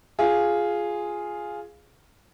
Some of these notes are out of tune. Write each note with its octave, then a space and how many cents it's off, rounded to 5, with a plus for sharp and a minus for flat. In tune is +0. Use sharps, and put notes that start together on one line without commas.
F4 +0 G#4 +0